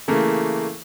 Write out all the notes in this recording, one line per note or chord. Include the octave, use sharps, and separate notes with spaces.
C#3 E3 A3 A#3